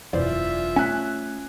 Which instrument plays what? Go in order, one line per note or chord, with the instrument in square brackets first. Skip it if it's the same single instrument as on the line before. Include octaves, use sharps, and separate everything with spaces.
[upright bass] E1 F#2 [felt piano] E3 C5 D5 [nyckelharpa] F4 E5
[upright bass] A3 [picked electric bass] C#4 [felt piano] G#5 F#6 B6